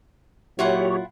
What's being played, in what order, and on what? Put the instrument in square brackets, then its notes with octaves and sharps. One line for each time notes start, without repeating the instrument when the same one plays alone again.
[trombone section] A#2 F#3 [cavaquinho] E4 F4 F#5 [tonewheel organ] G4 C#5